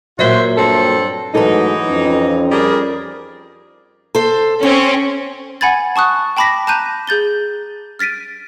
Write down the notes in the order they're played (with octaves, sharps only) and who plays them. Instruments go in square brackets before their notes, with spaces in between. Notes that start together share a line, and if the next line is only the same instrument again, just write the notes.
[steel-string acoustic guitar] A#2 F#3 [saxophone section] F#4 C5 E5
[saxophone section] G2 C4 A4
[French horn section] G#2 F#3 A3 [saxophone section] E3 D#4 [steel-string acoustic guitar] A4 B4
[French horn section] F2 C#4
[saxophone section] G3 G#4 A#4
[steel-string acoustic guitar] A4 C5
[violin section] C4 C#4 [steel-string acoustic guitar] C#5
[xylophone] F#5 G#5 B5 G#6 A6
A5 C#6 D#6 F#6
G5 A5 B5 D6 A#6 B6
A5 A#5 F#6 G6 D#7
G#4 G6 A6 G7
F6 A6 B6 D7 D#7